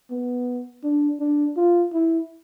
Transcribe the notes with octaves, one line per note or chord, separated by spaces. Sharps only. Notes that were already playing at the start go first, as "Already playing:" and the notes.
B3
D4
D4
F4
E4